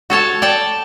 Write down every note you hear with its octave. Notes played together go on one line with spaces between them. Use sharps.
F#4 A4 C#5 A5
D5 G5 A5